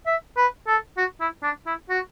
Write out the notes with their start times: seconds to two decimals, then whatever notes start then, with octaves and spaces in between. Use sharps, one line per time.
0.06 E5
0.37 B4
0.67 A4
0.97 F#4
1.20 E4
1.43 D4
1.67 E4
1.90 F#4